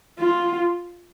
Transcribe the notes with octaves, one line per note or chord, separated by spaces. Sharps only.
F4